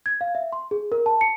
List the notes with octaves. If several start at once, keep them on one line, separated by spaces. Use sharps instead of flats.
G#6
F5
E5
C6
G#4
A#4
A5
C#7